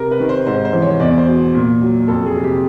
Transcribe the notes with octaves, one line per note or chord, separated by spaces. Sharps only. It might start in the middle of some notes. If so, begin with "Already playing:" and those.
Already playing: C3 A#4
B4
D#3
C5
G#2 C5
C5
E3
C#5
E2 D5
C5
B2
A#2
F#3
F2 A4
G#4
C3
G4